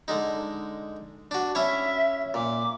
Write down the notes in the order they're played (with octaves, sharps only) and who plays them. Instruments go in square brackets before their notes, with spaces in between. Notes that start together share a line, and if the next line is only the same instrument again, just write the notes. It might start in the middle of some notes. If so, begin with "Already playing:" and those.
[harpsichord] D3 G#3 D#4
D4 F#4
[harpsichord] C#4 E4 C#5 [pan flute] E5
[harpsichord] A#2 [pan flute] D6